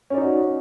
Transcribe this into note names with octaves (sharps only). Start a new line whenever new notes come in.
C#4 D#4 F#4 D5